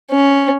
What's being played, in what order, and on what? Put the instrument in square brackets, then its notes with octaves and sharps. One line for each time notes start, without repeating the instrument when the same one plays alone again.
[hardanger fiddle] C#4